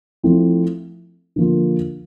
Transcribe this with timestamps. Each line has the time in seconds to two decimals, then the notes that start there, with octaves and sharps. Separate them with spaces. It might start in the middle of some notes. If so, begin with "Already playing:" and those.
0.23 F3 A3 C4 E4
1.36 D3 F3 A#3 F4